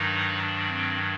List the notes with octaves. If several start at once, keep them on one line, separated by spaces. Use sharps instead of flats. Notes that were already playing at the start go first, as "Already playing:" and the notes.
Already playing: G2 D#3 F#3 D#4
D4
C4